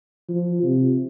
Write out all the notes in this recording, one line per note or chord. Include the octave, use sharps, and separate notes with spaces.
F3
C3